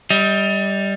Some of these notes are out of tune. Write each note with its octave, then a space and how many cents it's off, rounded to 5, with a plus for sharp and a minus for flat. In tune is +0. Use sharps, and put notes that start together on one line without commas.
G3 +0 D#5 +35